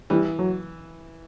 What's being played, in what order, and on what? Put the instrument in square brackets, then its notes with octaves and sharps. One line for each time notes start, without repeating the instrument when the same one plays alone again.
[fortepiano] E3 [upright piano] G3
[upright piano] F#3